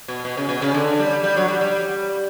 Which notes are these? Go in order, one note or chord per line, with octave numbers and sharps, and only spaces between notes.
B2
B2
C#3
B2
C#3
D3
G3
G3
F#3
G3
G3